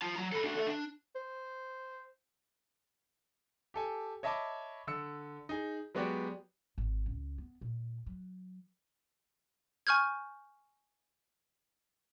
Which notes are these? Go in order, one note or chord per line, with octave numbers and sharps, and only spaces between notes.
F4 A5
F#3 A#5
A4 B5
D4 F#4
A4 E5
D4
C5
G4 A4 G#5
C#5 D#5 E5 A5 B5 D6
D3 E6 C#7
D#4 G#4
F#3 G#3 B3 F#4 G4 D5
G#1
C#2
B3
A#2
F#3
G#5 C#6 F6 G6 G#6